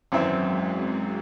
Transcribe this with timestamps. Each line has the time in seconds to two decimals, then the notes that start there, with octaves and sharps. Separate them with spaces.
0.12 G#1 F#2 E3 F#3 C4 E4
0.42 G#3
0.72 C4